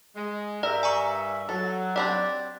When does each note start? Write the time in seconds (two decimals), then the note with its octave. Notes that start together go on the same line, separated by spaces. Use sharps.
0.15 G#3
0.63 G2 A#4 D5 E5
0.83 G#5 A#5 C#6
1.49 F#3 A4
1.96 C4 D4 G4 D5